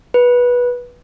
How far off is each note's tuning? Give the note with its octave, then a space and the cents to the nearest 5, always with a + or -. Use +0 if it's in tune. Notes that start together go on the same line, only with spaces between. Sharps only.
B4 -15